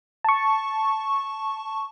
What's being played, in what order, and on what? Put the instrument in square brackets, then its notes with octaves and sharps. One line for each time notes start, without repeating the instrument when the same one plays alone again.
[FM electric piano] A5 C#6